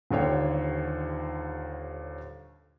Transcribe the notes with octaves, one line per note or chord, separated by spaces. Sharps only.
D#1 D#2 D3 C#5 G5